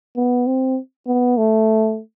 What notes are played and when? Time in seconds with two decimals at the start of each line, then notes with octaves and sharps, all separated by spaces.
0.17 B3
0.47 C4
1.07 B3
1.37 A3